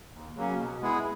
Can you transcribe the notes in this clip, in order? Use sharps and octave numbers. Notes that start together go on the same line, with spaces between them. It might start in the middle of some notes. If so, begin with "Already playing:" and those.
D#2
C#3 F#3 A#3 C#4
B2
G#3 B3 E4 G#4